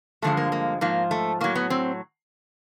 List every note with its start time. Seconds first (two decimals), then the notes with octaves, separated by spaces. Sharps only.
0.22 G2 D3 F3 G#3 A3
0.37 A#3
0.52 A#3
0.81 G#2 F3 A#3
1.11 A3
1.41 A2 F#3 A#3
1.56 B3
1.70 C4